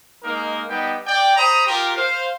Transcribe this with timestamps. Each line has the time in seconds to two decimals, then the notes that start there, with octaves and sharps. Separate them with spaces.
0.23 G#3 A#3 D#4 A#4
0.69 G3 B3 D#4 G5
1.06 D5 G5
1.37 C5 A#5 B5 D#6
1.67 F4 G4 A#4
1.96 C5 F5